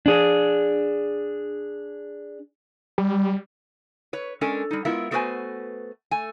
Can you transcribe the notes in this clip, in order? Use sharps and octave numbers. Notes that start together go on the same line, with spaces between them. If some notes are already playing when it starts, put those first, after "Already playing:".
D4 G#4
G3
B4 C#5
G#3 C#4 D4 A4 A#4 G#5
G3 D#4
G#3 B3 E4 F4 A#4 E5
A3 B3 F#4 B4 C5 G#5
A3 G#5